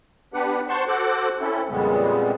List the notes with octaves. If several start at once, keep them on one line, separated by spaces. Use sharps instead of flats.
B3 D4 G4 B4 F#5
C5 F#5 A5 C6 C#6
F#4 A4 C5 F#5 D6 F#6
C4 C#4 E4 A4
F2 A#2 C#3 G3 G#3 B3